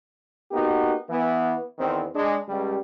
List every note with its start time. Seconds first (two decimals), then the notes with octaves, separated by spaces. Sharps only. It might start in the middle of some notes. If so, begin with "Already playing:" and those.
0.51 A#3 B3 D#4 F#4 G4
1.10 E3 B3
1.79 E2 D#3 C4
2.16 G#3 D4
2.49 C#2 G3